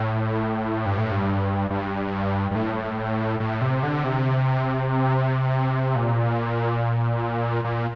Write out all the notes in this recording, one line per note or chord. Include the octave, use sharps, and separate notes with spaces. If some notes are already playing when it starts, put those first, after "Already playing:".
Already playing: A2
G2
A2
G2
G2
G2
A2
A2
C3
D3
C3
A#2
A#2